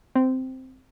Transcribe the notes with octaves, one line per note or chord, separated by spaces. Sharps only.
C4